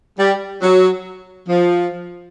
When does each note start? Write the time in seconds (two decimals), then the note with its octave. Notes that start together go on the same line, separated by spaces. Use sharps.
0.19 G3
0.62 F#3
1.49 F3